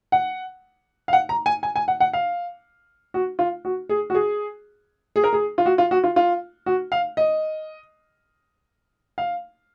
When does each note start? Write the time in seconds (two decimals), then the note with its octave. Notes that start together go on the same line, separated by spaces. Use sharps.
0.12 F#5
1.08 F5
1.13 F#5
1.29 A#5
1.46 G#5
1.63 G#5
1.76 G#5
1.88 F#5
2.00 F#5
2.13 F5
3.14 F#4
3.39 F4
3.65 F#4
3.89 G#4
4.10 F#4
4.15 G#4
5.16 G#4
5.24 A#4
5.33 G#4
5.58 F4
5.66 F#4
5.78 F4
5.91 F#4
6.04 F4
6.16 F4
6.66 F#4
6.92 F5
7.17 D#5
9.18 F5